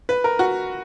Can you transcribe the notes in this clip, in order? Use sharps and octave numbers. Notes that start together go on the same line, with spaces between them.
B4
A#4
F#4